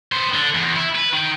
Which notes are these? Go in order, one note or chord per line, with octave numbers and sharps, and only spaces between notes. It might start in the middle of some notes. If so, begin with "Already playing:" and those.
B3 C5
D3
E2
E4
B4
D#3 G5